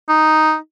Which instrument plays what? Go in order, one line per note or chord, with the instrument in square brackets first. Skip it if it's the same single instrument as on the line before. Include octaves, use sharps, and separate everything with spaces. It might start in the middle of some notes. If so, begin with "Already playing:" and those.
[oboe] D#4